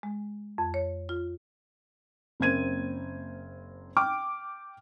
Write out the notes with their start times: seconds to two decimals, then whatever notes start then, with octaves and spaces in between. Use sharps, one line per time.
0.03 G#3
0.58 F2
0.74 C#5
1.09 F4
2.40 F#1 A#3 C4 G#6 D#7
3.97 G5 D6 F6